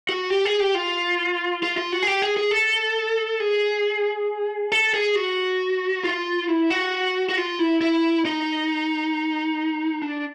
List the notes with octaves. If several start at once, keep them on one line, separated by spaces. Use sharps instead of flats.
F#4
G4
G#4
G4
F4
F4
F4
F#4
G#4
G4
G#4
G#4
A4
G#4
A4
G#4
F#4
F4
E4
F#4
F#4
F4
E4
E4
D#4
D4